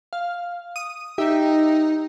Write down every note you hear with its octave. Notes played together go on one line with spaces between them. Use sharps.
F5
D#6
D#4 G4 E5